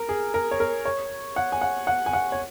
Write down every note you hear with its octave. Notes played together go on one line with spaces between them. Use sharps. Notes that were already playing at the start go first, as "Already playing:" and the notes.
Already playing: A#4
G#4
A#4
C#5
A#4
C#5
F#5
G#5
F#5
F#5
G#5
F#5
C#5